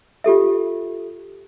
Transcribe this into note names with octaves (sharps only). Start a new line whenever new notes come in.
F4 G4 A4 E5